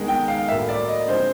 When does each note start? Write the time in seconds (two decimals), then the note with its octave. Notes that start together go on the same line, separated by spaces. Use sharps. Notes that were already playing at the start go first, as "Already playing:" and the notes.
Already playing: D#3 G#3 B3
0.08 G5
0.28 F5
0.48 A2 F#3 A#3 E5
0.69 D5
0.88 D#5
1.08 D3 F3 G#3 C4 C5